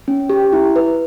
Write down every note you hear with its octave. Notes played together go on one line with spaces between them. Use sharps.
C#4
G4
E4
B4